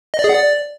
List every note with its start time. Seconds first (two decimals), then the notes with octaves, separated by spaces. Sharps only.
0.14 D#5
0.19 D5
0.24 G#4
0.29 F#5
0.35 D5